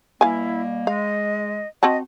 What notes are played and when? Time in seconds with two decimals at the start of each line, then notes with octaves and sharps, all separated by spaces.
0.21 B2 G3 A#3 E4 F5 G#5
0.87 G#3 D#5 F5
1.83 C4 F#4 D#5 A5